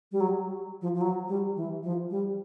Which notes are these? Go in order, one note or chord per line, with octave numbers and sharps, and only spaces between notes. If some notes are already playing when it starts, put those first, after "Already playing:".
G3
F#3
F3
F3
F#3
G3
E3
F3
G3